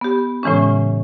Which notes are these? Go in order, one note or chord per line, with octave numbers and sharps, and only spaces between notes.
B3 G4
A2 C#3 E3 G#3 C#4